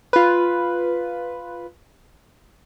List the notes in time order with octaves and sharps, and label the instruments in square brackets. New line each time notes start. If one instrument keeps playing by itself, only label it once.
[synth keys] F4 B4